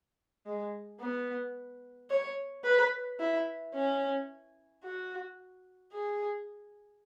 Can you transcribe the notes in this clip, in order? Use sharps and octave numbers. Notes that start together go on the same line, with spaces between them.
G#3
B3
C#5
B4
E4
C#4
F#4
G#4